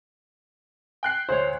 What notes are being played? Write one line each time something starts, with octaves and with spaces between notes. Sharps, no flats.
G5 F#6 C7
D2 C5 C#5